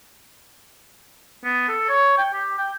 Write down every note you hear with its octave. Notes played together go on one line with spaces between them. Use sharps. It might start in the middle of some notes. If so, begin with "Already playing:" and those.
B3
A4
C#5
G5
G4
G5